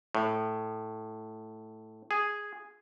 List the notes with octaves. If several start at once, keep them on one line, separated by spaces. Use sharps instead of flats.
A2
G#4